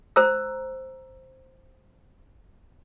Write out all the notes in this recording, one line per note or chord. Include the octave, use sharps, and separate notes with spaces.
C5 A#5 E6